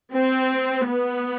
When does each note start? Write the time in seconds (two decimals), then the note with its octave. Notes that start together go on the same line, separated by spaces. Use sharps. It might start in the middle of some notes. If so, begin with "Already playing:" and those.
0.13 C4
0.89 B3